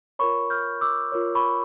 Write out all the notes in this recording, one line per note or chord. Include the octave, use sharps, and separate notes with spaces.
F4 A#4 C#5 B5 C#6
F6 G6
D6 E6
F4 A#4 C#5
B5 C#6